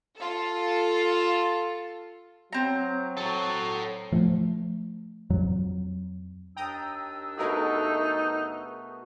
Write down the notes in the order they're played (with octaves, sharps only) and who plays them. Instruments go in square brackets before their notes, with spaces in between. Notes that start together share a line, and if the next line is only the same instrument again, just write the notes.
[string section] F4 A4
[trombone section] F#3 [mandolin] C4 A#5
[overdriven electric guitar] A4 C#5
[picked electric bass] F3 A3
F2 F#3
[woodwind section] D#2 D4 E6 [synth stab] G5 A#5 D#6
[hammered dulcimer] B2 A3 F#4 [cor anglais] D#4 [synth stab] G#4 A#4 B4